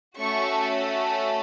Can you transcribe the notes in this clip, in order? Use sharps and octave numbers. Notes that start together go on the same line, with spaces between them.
A3 C#4 F#4 A4 C#6